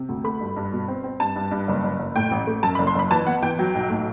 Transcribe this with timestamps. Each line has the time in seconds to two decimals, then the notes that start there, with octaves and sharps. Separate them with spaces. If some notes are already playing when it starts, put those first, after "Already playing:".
Already playing: C3
0.09 D2
0.24 A3 B5
0.40 G2
0.56 G2
0.72 B2
0.88 C4
1.04 C4
1.20 G2 A5
1.36 G2
1.51 G2
1.68 F#1
1.84 F#1
1.99 F#1
2.16 A2 G5
2.31 A1
2.47 A3
2.63 F#2 A5
2.75 B5
2.79 F#1
2.87 C6
2.95 F#1 B5
3.11 E3 A5
3.27 B3 F#5
3.43 E3 G5
3.59 F#3 G5
3.75 B1
3.90 A2